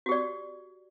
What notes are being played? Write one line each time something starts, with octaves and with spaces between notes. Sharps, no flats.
F#4 G4 D5